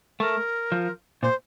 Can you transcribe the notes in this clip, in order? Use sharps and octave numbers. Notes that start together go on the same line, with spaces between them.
A3 A#4
F3
A#2 C5